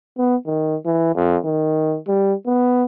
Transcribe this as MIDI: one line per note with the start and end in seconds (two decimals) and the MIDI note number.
0.18 0.36 59
0.47 0.76 51
0.86 1.11 52
1.15 1.37 41
1.45 1.97 51
2.07 2.33 55
2.46 2.84 59